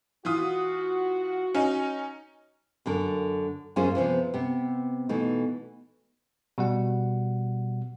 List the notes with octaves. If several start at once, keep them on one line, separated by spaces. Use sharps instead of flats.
E3 F4 F#4 D#6
C#4 D#4
F#2 D3 A#4
F#2 A#3 C#4 F4 G#4 C5
C3 E3 F3 B3
C3 B3
B2 E3 A3 D#4
B2 G3 F#5